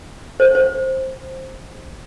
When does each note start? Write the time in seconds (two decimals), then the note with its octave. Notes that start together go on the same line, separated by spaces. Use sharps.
0.40 C5
0.55 C5